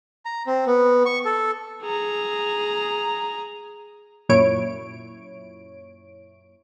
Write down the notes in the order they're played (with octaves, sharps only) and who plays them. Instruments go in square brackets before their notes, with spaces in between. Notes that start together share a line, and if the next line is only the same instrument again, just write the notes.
[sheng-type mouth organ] A#5
C4
B3
C#6
A4
[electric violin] G#4 A#5
[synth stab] F#2 A#2 E4 C#5 D7